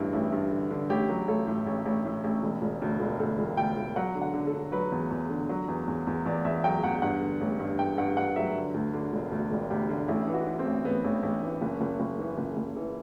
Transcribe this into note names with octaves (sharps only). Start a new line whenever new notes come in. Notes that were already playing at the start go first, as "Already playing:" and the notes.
Already playing: A1 G2 D3 E4 F#4
A1 E4
G2
D3
D3
A1 G4
F#3
A1 A4
A2
A1
A1
A2
A1
E1
E1
D2
E1
D2 A4
E1
D2 G5
E1
F#3 F#5
D3
F#5
D3
A4
D3
F#3 B4
E2
E2
D3
F#3
E2
E2
E2
E2 D5
E2 E5
F#3 G5
E2 F#5
G2 F#5
D3
A1
G2
G2 G5
G2 F#5
G2 F#5
F#3 E5
D3
D2
D3
E1
D2
E1
D2 G4
D3
A1 E4
E3
F#4
E3
C4
A1
A1 B3
A1
A1
E3
F#1
F#1
F#1
E3
F#1
F#1
E3